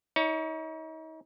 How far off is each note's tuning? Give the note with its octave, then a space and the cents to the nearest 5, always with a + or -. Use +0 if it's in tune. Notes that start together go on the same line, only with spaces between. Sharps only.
D#4 +40 C#5 +30